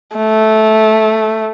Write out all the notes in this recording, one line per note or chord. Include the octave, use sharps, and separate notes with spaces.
A3